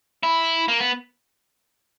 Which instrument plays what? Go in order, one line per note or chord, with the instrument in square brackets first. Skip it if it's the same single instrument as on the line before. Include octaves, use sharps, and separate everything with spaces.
[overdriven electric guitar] E4
A#3
B3